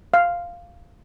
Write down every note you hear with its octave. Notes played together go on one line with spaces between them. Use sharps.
F5